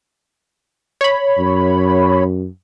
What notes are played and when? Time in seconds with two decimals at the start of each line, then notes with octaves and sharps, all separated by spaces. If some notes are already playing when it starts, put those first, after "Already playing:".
1.01 C#5 B5
1.39 F#2